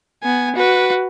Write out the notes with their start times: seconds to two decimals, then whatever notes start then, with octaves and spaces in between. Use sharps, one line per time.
0.23 B3 G#5
0.55 F#4 B4